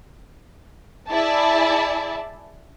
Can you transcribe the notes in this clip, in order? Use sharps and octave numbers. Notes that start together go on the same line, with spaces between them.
E4 G#4 D5 E5 A5